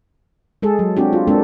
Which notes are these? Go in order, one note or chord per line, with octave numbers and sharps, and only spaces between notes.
G#3 G#4 A4
F#3
C4 D4 F#4 G4
F4
G#3 A#3 C4 D4 A4